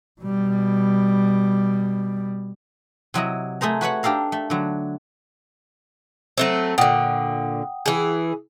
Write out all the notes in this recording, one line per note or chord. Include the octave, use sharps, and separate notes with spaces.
B2 G3
C3 F#3 E4 D#5
A3 G#4 C5 A#5
F#4 B4 C#5 F#5
D4 G4 A4 F5 A#5
A3
D3 F#3
F#3 A3 C4
A#2 D3 F#5 G5 D#6
E3 G#4